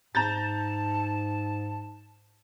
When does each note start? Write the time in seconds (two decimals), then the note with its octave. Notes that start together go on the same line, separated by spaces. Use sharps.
0.15 G#2 A5 A#5 G6 A6